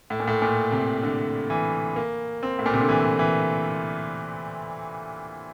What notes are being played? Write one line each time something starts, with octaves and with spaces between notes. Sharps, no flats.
A2
A#2
A2
A#2
C3
D3
E3
A#3
C4
A2
A#2
C3
D3
E3
E3